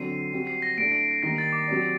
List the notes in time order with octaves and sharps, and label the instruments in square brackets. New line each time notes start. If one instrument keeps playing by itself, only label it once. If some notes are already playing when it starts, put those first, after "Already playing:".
Already playing: [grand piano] D3 F#3 C4 [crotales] C7 D#7
[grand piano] G3 C4 F#4
[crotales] C7
A#6
[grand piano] A2 A3 D4 [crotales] A#6 D7
[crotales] C7
C7
[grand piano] D#3 G3 A#3 [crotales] A#6
[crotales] A6
D6
[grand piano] F#3 C4 G4 D5